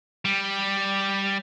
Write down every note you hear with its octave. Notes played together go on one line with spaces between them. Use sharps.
G3